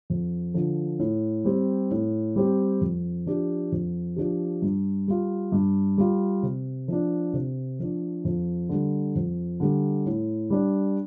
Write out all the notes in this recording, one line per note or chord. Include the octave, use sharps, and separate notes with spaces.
F2
D3 F3
A2
G3 C4 G4
A2
G3 C4 G4
F2
F3 D4 G4
F2
F3 D4 G4
G2
G3 F4
G2
G3 F4
C3
F3 D4
C3
F3 D4
F2
D3 G3
F2
D3 G3
A2
G3 D4